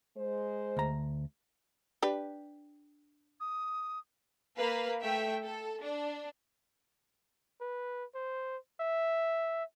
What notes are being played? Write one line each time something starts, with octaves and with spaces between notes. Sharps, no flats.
G#3 C5
D2 A#5
D4 G4 B4
D#6
A#3 B4 F5
A3 E5 G5
A4
D4
B4
C5
E5